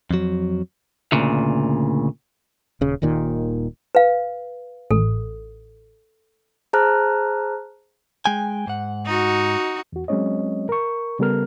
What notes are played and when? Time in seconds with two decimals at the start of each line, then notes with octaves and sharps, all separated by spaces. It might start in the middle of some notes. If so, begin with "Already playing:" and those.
0.11 F2 F#3
1.12 D2 A#2 C#3
2.81 D#1 C#3
3.02 D#1 D#2 A#2 D#3
3.95 B4 F5
4.91 A1 A4
6.73 G#4 C5 A5 A#5 F6 F#6
8.26 G#3 G5 G#5
8.67 G#2 F#5
9.06 D#4 F#4
9.92 E2 F#4
10.08 F#3 G#3 C4 C#4 C#5 D#5
10.69 A#4 C#6
11.19 C#3 G3 B3 A4 A#4 F6